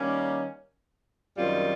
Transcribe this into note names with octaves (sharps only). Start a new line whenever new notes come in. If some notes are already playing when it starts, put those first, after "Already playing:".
Already playing: D#3 G3 A#3 C#4
F#2 D#3 G3 C4 F4